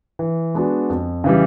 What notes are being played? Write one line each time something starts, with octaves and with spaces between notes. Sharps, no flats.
E3
G#3 B3 D4 F#4
F2
C#3 E3 G3